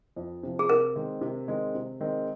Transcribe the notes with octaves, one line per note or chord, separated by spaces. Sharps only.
F2
C3 F3
G#4
C3 A#4
D#3 G#3 C4
C3
D#3 G#3 C4
C3
D#3 G#3 C4